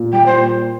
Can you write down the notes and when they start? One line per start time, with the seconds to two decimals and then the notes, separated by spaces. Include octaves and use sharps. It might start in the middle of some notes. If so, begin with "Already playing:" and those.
Already playing: A#2
0.13 G3 G5
0.26 C5
0.32 A#2